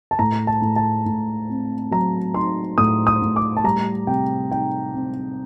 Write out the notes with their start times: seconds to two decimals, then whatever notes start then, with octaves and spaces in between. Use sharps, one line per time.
0.11 A5
0.19 A2 A#5
0.47 A5
0.62 A2
0.76 A5
1.06 A2
1.49 C4
1.91 F#3 A#5
2.34 D#4 C6
2.78 A2 D#6
3.07 D#6
3.22 A2
3.36 D6
3.57 A5
3.64 G3 A#5
4.07 C3 G5
4.51 D#4 G5
4.94 C4